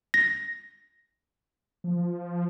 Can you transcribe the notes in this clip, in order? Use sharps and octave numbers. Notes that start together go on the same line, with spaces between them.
A#6
F3